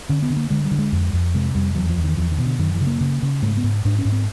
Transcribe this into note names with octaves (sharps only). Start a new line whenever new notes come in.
D3 C#4
B3
D3
A#3
D3 G#3
G3
D3
G#3
F2
F2
C3 G#3
F2 G3
E2 F#3
F3
E2
D#3
E2 F3
D#3
B2
D3
F#2 D#3
E3
C#3
A#3
C#3
C#3
G#2 A3
B3
G#2
G#2 D4
C#4
G#2
C4